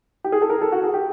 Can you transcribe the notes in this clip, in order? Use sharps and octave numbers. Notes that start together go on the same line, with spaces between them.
G4
G#4
A4
A#4
A4
F#4
G#4
G4